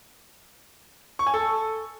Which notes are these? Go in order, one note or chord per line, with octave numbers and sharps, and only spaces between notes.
C#6
G#5
A4